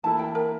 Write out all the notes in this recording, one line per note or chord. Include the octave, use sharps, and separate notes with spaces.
E3 A#3 E4 A4 A5
G5
A#4